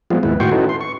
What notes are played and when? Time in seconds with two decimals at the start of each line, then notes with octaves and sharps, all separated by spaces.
0.10 F3 G3 G#3 B3 C4 F4
0.23 D#2 G#2 E4 B4
0.40 A2 D#3 F#4 G5 C6 C#6
0.51 C#4 D#4 E4 F#4 A4 B4
0.69 C6
0.81 C#6